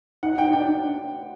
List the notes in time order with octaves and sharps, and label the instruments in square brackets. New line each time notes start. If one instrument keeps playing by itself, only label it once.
[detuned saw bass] D#4 [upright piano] F#5
[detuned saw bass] D#4 [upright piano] G5
[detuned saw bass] D4 [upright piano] G5